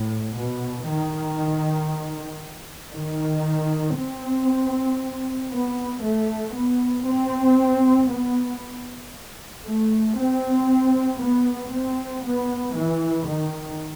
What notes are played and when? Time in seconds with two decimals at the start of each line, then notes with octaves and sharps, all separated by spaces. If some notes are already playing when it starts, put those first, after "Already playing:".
Already playing: A2
0.36 B2
0.88 D#3
2.94 D#3
3.97 C4
5.52 B3
6.04 A3
6.55 B3
7.07 C4
8.10 B3
9.65 A3
10.17 C4
11.19 B3
11.71 C4
12.23 B3
12.74 E3
13.26 D#3